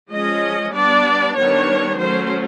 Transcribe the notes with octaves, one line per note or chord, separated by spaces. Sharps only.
F3 G#3 C#4 D#5
G3 B3 D4 D5
D#3 G3 B3 D4 C#5
F#3 A3 C#4 C5